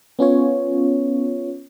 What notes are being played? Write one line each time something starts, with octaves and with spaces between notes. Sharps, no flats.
B3 C#4 F4 C#5